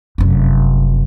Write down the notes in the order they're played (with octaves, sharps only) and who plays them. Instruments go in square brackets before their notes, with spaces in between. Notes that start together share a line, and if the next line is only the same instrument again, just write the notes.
[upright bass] F1 F#2